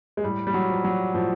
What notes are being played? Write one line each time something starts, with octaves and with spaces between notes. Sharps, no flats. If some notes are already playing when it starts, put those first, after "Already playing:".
G#3
A2 G3
G3
F#3
F3
F#3
A2 F3